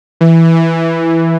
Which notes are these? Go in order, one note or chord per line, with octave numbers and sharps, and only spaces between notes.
E3